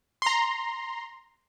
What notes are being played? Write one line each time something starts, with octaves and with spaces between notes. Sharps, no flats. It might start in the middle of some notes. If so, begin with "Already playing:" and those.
A#5 C6